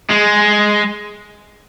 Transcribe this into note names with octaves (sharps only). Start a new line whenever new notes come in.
G#3